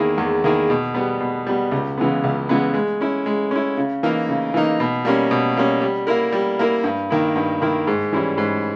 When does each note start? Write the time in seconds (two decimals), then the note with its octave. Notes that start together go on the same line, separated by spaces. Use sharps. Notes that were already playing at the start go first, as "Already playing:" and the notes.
Already playing: E2 D#3 A#3 E4 G#4
0.18 E2
0.44 D#3 A#3 E4 G#4
0.70 B2
0.95 G3 B3
1.20 B2
1.47 G3 B3
1.72 C#2
1.98 C#3 E3 G#3 B3
2.24 C#2
2.49 C#3 E3 G#3 B3
2.74 G#3
3.01 C#4 E4
3.26 G#3
3.51 C#4 E4
3.77 C#3
4.03 E3 A#3 D#4
4.29 C#3
4.54 E3 A#3 D#4
4.80 B2
5.05 G3 A#3 C#4
5.31 B2
5.57 G3 A#3 C#4
5.82 G3
6.07 A#3 E4 A#4
6.32 G3
6.59 A#3 E4 A#4
6.84 G2
7.10 D#3 A#3 E4
7.36 G2
7.61 D#3 A#3 E4
7.87 G#2
8.13 E3 G3 C#4 E4
8.38 G#2